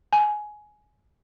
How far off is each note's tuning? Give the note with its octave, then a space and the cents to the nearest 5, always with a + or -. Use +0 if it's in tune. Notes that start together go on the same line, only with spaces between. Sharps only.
G#5 +15